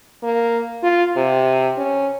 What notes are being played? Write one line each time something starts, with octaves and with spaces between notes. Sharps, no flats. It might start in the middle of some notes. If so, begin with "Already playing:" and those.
A#3
F4
C3
C#4